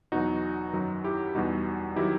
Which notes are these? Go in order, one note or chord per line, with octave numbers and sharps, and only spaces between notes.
E2 B2 F#3 D#4 F#4
F#2 D#3 F#3
E4 G4
E2 B2 G3 D#4 F#4
D#3 F#3 E4 G4